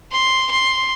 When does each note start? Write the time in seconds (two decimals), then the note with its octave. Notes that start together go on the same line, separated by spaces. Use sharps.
0.12 C6
0.51 C6